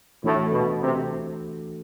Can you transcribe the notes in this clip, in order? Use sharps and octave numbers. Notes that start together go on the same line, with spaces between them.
A2 E3 A3 D4 F#4 A4
B2
C3